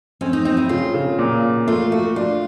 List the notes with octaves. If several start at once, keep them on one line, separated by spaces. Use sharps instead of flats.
C4 C#4
D#4
C4 D#4
E4
C#3 F4
C#3
A#2
A#2
A3 F4
A3 F#4
D4 F4